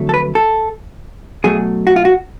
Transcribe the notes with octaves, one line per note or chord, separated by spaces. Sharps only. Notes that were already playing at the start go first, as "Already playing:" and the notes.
Already playing: F2 D3 F#3 A3
A4
B4
A4
B2 F#3 A3 G#4
F#4
F4
F#4